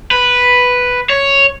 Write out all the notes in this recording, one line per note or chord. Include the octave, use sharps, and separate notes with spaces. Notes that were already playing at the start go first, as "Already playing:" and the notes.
B4
C#5